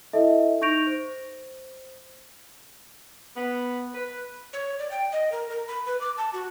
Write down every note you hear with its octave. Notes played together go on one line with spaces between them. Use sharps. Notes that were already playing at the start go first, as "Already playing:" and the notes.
E4 A4 D#5 E5
D#4 C#6 G6 A#6 D7 F7
C5
B3
B4
C#5
D5
G5
D#5
A#4
A#4
B5
B4
D6
A5
F#4